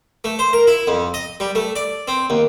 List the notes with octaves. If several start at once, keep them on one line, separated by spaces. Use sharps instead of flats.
A3
C5
A#4
E4
F2
D#5
G3
A3
D5
C4
D#2